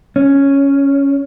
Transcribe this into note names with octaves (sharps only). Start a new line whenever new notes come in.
C#4